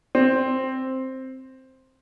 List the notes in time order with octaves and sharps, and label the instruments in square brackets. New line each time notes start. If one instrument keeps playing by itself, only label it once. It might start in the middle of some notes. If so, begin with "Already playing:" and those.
[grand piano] C4